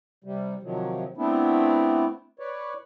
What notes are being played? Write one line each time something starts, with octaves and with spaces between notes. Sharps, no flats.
C3 G3
C3 D#3 F3 F#3
A3 B3 C4 D4 E4
B4 C#5 D5